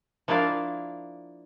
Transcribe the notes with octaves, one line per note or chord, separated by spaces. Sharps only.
F3 A#3 D4 E4 D5 F5